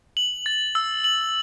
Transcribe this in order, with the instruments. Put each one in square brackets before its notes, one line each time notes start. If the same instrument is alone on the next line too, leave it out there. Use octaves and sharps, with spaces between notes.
[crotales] F#7
A6
E6
F#7